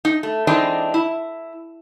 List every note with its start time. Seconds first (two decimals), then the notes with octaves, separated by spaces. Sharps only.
0.05 D#4
0.23 A3
0.47 E3 G#3 C4 D4 D#4 D#5
0.94 E4